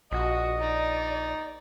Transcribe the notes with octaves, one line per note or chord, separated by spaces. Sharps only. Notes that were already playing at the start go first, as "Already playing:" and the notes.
A#1 F#4 D#5
D#4 D5